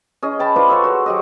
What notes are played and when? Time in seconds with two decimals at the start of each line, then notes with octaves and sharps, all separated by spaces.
0.23 C#4 G#4 D#5
0.39 G5 A5 B5
0.56 F4 B4 C5 D5
0.69 G#4 A4 C#5 F#5
0.84 F#4 C5
1.06 F#3 G4 D#5